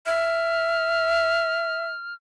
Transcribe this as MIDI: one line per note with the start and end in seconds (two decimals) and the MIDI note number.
0.06 1.86 76
0.06 2.14 89